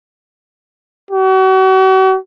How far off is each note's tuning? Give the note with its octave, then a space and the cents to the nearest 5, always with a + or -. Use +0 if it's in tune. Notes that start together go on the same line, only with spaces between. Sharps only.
F#4 +40